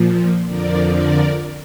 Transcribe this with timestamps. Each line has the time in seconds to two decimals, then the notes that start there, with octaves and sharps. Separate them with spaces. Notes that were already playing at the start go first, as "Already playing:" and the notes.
Already playing: A#2 F3
0.46 F2 D3 F3 A#4 D5
0.91 A#4 D5